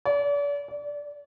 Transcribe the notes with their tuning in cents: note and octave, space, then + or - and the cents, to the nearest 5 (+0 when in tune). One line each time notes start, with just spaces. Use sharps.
D5 -40
D5 -10